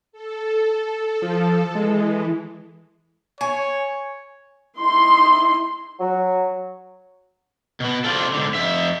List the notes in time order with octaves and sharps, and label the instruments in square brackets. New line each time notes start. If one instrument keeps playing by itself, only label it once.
[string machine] A4
[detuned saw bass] F3
[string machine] E3 [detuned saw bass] G#3
[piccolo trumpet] C#5 [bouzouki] G#5
[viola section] D#4 E4 C6
[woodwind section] F#3
[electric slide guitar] B2 B3
C3 C4 D4 F4 A4
G#2 D3
F2 E5